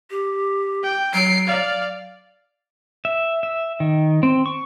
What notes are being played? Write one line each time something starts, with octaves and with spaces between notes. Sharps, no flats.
G4
G5
F#3 C7 D7
D5 F5
E5
E5
D#3
C4
C#6